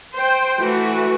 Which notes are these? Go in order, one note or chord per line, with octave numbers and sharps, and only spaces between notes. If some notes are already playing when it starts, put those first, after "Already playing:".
C5 G5
E3 A3 F#4